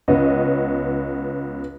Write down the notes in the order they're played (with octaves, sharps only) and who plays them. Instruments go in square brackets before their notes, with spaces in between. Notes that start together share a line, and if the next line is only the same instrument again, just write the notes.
[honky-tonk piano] C#2 B3 C#5 D#5